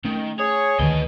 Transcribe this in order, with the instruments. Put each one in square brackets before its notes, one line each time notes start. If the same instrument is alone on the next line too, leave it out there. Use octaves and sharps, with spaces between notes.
[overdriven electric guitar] D#3 [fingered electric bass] A3 C#4
[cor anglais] G#4 [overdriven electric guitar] C#5
[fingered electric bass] D2 D#3 [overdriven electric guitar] B4 D#5